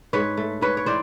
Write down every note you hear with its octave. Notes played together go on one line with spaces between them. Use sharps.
G#2 B4 C#5
A3
G#2 B4 C#5
C#5
E3 C5 D5